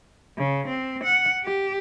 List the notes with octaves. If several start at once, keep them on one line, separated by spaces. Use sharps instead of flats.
C#3
C4
F#5
G4